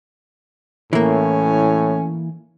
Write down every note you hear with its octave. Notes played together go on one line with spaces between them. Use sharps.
A2 E3 A#3 C#4